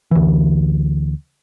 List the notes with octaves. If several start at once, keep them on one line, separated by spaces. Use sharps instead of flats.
D2 E3